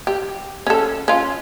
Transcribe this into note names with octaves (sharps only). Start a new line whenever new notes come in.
G4
C#4 A4
C#4 F4